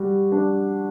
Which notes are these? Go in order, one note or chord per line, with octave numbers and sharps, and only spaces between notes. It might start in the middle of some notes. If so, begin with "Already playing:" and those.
Already playing: G3 F#4
D4